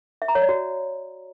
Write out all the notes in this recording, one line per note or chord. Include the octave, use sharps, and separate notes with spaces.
E5
A#5
C#5
D5
F#4